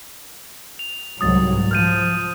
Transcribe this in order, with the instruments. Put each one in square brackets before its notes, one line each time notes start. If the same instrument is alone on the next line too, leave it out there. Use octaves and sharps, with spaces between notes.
[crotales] F7
[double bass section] C2 G#2 F#3 [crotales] D#6 A6
[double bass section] F3 [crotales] F6 G6 D#7